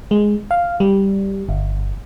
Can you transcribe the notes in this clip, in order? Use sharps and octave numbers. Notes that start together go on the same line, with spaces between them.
G#3
F5
G3
G1